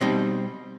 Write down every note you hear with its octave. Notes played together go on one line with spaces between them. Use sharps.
B2 G3 C4 D#4 D#5